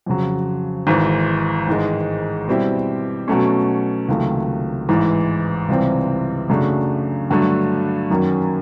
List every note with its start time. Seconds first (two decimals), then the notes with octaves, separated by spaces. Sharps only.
0.06 F2 C#3 F#3
0.87 G#1 G#2 E3
1.67 A1 G#2 D#3 G#3
2.48 B2 G3 C4 E4 G4
3.28 B2 F#3 A3 C#4
4.09 C#2 C3 D#3 F#3 A3
4.89 A1 G#2 E3
5.69 C#2 C3 E3 G3 C4
6.49 F#2 C#3 F#3 A3 D4
7.30 G2 D3 F#3 A3
8.10 F#2 D#3 F#3 A#3 C#4